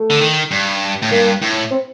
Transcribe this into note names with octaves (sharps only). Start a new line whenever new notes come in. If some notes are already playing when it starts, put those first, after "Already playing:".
Already playing: A3
D3
D#3
G2
A2
G2 A#3
A2
C4